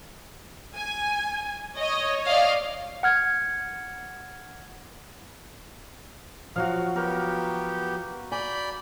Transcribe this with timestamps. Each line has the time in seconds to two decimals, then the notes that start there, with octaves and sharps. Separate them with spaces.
0.77 G#5
1.78 C#5 D#5
2.27 D5 D#5 F5
3.03 F#5 F6 G#6
6.56 F3 F#3 F#4 F5
6.96 B3 G4 A#4
8.32 D5 G#5 B5 G6